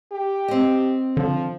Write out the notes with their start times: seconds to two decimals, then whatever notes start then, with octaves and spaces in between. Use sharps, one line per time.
0.12 G4
0.48 C4 D#5
1.17 D3 F3